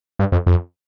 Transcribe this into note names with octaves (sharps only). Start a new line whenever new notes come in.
G2
F2
F2